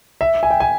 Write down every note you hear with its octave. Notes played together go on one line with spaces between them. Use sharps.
E5
G#5
G5
G#5